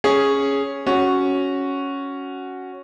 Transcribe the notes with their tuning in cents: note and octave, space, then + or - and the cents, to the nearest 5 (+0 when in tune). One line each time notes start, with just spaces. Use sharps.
C#4 +0 G#4 +0
C#4 +0 F#4 +0